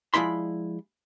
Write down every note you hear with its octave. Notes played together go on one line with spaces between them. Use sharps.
F3 G#3 E4 D5 B5 C6